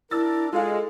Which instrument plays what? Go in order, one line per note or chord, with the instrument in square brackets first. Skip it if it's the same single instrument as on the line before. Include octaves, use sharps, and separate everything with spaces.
[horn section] D4 A#4 [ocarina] E4 [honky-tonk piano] E6 A6
[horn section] G#3 [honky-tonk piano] F4 F5 [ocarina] A4